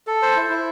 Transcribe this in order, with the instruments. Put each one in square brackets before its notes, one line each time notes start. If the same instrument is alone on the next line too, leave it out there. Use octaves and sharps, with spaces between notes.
[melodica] A4
C5
E4
E4